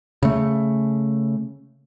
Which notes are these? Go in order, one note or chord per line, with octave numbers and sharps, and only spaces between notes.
C#3 A3